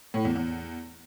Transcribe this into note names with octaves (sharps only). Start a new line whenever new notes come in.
A2
E2
E2